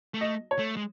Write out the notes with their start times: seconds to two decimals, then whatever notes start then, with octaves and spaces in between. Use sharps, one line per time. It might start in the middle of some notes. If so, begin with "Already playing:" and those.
0.14 A3
0.21 D#5
0.51 C#5
0.59 A3
0.77 G#3